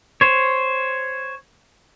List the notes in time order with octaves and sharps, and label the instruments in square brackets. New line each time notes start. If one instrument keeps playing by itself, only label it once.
[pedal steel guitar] C5 C#5